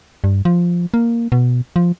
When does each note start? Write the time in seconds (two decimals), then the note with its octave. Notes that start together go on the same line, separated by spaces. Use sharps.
0.24 G2
0.45 F3
0.94 A#3
1.32 B2
1.76 F3